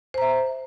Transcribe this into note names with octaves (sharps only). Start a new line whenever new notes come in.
C5 E5 A#5